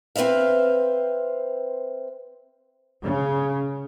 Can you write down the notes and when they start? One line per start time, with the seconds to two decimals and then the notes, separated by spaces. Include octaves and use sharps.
0.16 C4 B4 C5 E5 F5
3.03 C#3